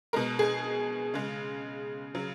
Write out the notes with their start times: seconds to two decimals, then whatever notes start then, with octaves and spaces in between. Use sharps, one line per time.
0.13 B2 G#3 A#4
0.39 G#4
1.14 C#3 G#3
2.15 C#3 F#3